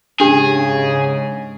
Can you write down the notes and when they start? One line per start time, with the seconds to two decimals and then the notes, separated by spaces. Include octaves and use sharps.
0.20 G#2 C#3 D4 G4 G#4